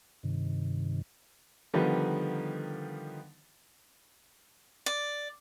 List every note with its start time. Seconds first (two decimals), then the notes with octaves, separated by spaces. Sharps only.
0.23 G2 C3 D#3
1.74 D3 D#3 F3 G3 B3 D#4
4.86 D5